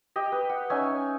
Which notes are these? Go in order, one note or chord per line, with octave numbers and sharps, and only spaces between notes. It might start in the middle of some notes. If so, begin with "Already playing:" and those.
G4 D#5
B4
F#5
C#4 D#4 E5 G#5